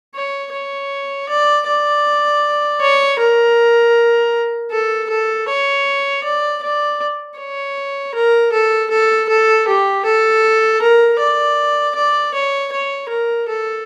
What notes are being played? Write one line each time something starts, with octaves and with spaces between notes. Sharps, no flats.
C#5
C#5
D5
D5
C#5
A#4
A4
A4
C#5
D5
D5
C#5
A#4
A4
A4
A4
G4
A4
A#4
D5
D5
C#5
C#5
A#4
A4